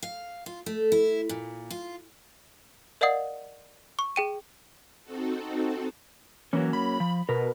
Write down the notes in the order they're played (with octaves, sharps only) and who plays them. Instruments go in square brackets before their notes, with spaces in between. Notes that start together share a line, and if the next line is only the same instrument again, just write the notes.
[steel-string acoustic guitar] F5
F4
A3
E4
A#2
F4
[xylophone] A#4 D5 D#5 F5 F#5 D#6
C#6
G#4 G5 D#7
[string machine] C4 D#4 F#4 A4
[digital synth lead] E3 [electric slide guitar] F#3 A#3 C#4
[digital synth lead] B5
[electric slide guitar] F3
[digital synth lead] B2 [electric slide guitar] A#4 B4